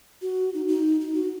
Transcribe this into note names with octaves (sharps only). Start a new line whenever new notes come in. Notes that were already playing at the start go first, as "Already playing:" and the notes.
F#4
D#4
D#4
D#4
F#4